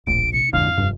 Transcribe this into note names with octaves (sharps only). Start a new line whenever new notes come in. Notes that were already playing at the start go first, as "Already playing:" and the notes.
D1 A#1 D7
C3 C#7
A#1 F2 G#2 D3 E4 F5
F1 G2